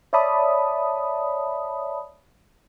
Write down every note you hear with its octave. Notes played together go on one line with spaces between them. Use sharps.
C#5 D5 E5 A5 B5 D#6